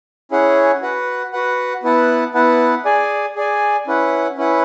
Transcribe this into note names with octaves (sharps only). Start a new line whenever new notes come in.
C#4 E4 G#4 C#5 F#5
F#4 B4 F#5
F#4 B4 F#5
B3 E4 B4 F#5 A5
B3 E4 B4 F#5 A5
G#4 D5 G#5
G#4 D5 G#5
C#4 E4 B4 F#5
C#4 E4 B4 F#5